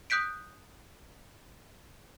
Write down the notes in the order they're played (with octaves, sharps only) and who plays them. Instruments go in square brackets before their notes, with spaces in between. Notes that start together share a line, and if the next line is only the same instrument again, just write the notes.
[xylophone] D#6 F#6 G6 B6 D7